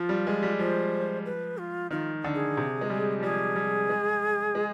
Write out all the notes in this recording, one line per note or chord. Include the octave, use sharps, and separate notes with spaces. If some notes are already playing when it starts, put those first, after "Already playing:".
Already playing: F3 F4
G3
G#3
G3
F3 C5
B4
F4
D#3 F4
D3
G#4
C3
G#3
G3
F3
G3 G#4
G3
G#3
G#3